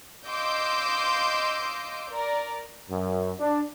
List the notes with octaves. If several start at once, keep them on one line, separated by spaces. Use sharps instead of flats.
D#5 F5 C6 D6 E6 G6
A#4 D5 A#5
F#2
D4